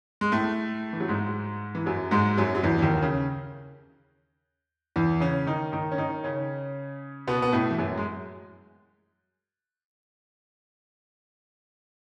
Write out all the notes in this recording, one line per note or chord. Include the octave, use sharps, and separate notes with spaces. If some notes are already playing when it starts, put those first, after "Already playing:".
G#3
A2 A3
E3
F#3
G#2 G#3
E3
F#2 F#3
G#2 G#3
F#2 F#3
F#3
E2 E3
E3
D#2 D#3
C#3
E2 E3
C#3 C#4
D#3 D#4
D#3 D#4
C#4
D#3 D#4
C#3 C#4
B2 B3
B3
A2 A3
E3
F#2 F#3
G#3